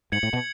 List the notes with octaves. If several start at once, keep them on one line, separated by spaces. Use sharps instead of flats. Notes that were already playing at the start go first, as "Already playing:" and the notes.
G#2 G#6 C#7 F#7
A2
B2